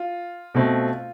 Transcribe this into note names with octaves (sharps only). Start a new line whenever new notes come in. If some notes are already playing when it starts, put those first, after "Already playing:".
Already playing: F4
B2 A3 C4